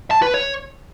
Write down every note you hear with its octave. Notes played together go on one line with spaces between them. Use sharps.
A5
B4
C#5